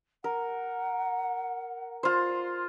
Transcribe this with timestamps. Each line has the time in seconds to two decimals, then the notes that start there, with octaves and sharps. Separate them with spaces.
0.24 A#4 F#5
2.03 F4 C5